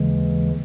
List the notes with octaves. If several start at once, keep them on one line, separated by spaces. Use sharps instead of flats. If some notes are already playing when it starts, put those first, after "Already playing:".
Already playing: D#2 C#3 E3 G#3